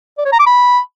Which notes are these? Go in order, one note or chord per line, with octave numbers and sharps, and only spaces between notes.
D5
C#5
A#5
D6
B5